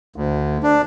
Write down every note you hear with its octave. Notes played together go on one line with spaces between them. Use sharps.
D2
D4